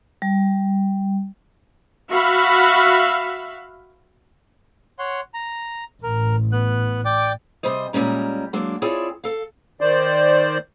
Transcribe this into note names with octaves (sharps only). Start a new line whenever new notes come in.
G3
F#4 E5 F5 B5
C#5 F#5 C6
A#5
A1 A#4
B3 F#6
D5 G5 D6
C3 G3 G#4 C5 D#5
A#2 G3 G#3 C#4 A#4
F#3 G#3 A#3 D4
C4 E4 F4 G#4 C#5 D5
A4 F5
D#3 C5 D5